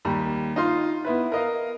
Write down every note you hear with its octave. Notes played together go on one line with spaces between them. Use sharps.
D#2 G3 A#5
D#4 F4 C6
B3 E4 B4
A#4 D#5 F5